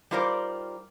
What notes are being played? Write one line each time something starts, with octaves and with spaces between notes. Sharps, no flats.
G3 D#4 F4 A#4 C5 D5